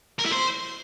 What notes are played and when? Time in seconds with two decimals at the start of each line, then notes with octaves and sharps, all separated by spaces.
0.19 A#4
0.25 E4
0.32 C5